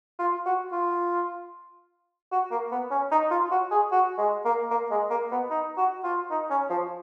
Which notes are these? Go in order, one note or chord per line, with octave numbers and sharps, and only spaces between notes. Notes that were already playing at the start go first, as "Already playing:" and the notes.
F4
F#4
F4
F#4
A#3
B3
C#4
D#4
F4
F#4
G#4
F#4
G#3
A#3
A#3
G#3
A#3
B3
D#4
F#4
F4
D#4
C#4
F3